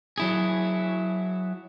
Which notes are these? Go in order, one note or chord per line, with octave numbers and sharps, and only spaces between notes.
F#3 E4 G#4